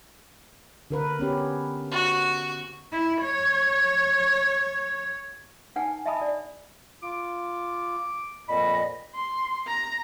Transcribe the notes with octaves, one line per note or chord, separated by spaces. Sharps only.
D3 A#4 B4
B3 C#4 G4
F#4
E4
C#5
D4 D#4 B4 F#5 G#5
D#5 E5 G#5 A5 B5 D#6
D5
F4 D6
F2 A#2 D#5 B5
C6
A#5